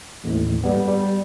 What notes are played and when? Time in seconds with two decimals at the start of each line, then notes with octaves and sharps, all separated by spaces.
0.24 A1 D#2 A2
0.64 G2 G3 B3
0.88 G3